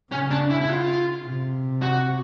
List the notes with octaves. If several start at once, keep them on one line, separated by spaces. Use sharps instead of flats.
C#3 C#4
D4
E4
E4
F4
C3
F#4